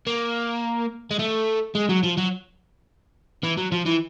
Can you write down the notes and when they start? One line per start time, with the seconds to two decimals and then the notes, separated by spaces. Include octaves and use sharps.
0.07 A#3
1.11 G#3
1.19 A3
1.75 G#3
1.89 F#3
2.03 F3
2.17 F#3
3.44 E3
3.58 F#3
3.72 F3
3.86 E3